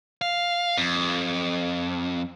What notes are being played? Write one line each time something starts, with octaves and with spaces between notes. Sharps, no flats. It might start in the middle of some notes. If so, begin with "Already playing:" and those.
F5
F2